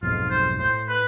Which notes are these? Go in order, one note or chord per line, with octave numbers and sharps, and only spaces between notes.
B1 F2 G#2 F4
C5
A2 C5
B4